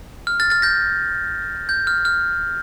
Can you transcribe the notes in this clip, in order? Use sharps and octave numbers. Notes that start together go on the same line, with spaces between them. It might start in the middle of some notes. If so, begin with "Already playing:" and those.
F6
F6 A6
F6 A6
G6 A#6
G6
F6
F6